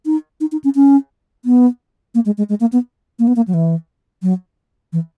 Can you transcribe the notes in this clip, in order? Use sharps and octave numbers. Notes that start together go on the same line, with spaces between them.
D#4
D#4
D#4
C#4
C#4
B3
A#3
G#3
G#3
G#3
A#3
B3
A#3
B3
A#3
F#3
E3
F#3
E3